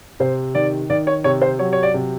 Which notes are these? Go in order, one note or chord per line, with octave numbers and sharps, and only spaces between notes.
C3 C5
D#3 D5
D#3 D5
C#5
C3 C#5
C5
F#3 C#5
C#5
D5
C3